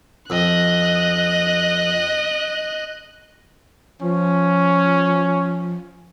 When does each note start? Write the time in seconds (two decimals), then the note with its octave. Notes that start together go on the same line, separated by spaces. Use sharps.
0.30 F2 D#5 F#6
4.02 F3 C#4